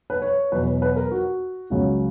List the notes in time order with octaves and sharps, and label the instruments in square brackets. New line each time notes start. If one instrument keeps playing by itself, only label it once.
[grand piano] B4
C#5
E2 B2 F#3 B4
B4
B4
A#4
F#4
C#2 C#3 F#3 F#4